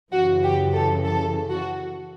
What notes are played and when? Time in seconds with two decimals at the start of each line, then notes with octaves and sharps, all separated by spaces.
0.11 F#2 C#3 E3 F#4
0.43 G4
0.73 A4
1.04 A4
1.50 F#4